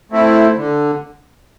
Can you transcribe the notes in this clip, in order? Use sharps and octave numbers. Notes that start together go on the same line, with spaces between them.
A3 C4 E4
D3